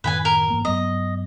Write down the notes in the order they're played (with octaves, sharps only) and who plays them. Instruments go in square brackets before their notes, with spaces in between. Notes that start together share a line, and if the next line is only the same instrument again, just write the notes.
[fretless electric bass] F#2 A2 D#3 [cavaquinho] B4 G5 G#5
[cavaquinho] A#4
[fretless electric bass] G#2 E3 A#3
[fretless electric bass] G2 F#3 B3 [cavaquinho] D#5